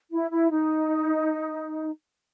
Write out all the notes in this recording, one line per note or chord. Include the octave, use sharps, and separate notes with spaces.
E4
E4
D#4